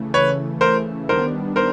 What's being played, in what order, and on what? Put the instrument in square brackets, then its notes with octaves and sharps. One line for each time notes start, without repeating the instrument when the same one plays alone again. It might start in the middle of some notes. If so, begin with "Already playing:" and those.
Already playing: [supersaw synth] C#3 E3 A3
[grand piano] B4 C#5
A#4 C5
[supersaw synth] D#3 G3 B3 D4 [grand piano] A#4 C5
[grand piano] A#4 C5